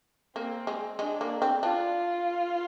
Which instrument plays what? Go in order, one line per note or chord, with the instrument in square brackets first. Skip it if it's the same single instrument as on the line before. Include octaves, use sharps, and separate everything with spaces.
[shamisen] A#3 [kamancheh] C4
[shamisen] G#3
[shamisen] G#3 [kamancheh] D4
[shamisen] A#3
C4
[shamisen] D4 [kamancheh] F4